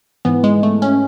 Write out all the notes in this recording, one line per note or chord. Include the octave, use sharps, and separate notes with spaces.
G#2 E3 B3
G#3
A3
C#4